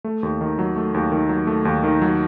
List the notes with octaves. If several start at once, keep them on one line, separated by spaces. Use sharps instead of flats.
A3
D#2
D#3
F#3
A3
D#2
D#3
F#3
A3
D#2
D#3
F#3